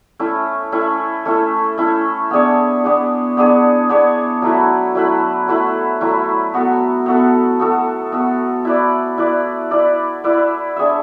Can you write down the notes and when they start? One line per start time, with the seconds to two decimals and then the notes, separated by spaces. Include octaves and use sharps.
0.19 A3 C#4 E4
0.72 A3 C#4 E4
1.25 A3 C#4 E4
1.78 A3 C#4 E4
2.31 B3 D4 G#4 C#5
2.84 B3 D4 G#4 C#5
3.37 B3 D4 G#4 C#5
3.89 B3 D4 G#4 C#5
4.42 F#3 A3 E4 B4
4.95 F#3 A3 E4 B4
5.48 F#3 A3 E4 B4
6.01 F#3 A3 E4 B4
6.54 B3 F#4 A4
7.06 B3 F#4 A4
7.60 B3 F#4 A4
8.12 B3 F#4 A4
8.65 E4 B4 D5
9.18 E4 B4 D5
9.71 E4 B4 D5
10.24 E4 B4 D5
10.76 D4 G#4 C#5 E5